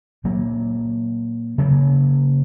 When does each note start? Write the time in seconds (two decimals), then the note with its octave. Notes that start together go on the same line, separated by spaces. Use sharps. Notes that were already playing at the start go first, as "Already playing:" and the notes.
0.24 A#2 F#3 A#3
1.58 C#3 F#3 A#3